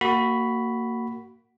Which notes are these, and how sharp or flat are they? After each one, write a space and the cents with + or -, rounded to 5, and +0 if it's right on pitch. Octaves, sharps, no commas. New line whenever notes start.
A#3 -20 F#4 +10 B5 +0